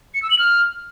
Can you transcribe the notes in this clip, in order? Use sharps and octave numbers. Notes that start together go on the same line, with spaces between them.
C#7
E6
F#7
F6